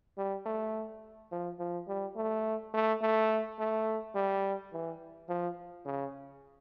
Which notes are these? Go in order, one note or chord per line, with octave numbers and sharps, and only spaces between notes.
G3
A3
F3
F3
G3
A3
A3
A3
A3
G3
E3
F3
C#3